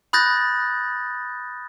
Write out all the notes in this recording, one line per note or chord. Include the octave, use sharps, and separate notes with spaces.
B5 D#6 F#6 G6 A6 A#6